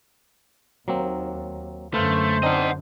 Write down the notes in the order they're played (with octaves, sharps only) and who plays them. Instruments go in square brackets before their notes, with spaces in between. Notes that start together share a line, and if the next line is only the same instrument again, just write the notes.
[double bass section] D#2 [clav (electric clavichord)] F#3 A#3 C4
[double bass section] F#2 D3 [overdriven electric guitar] A3 [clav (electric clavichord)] B4 F5 [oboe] C5
[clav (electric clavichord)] C4 D4 D#4 [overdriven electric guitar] D#5 F#5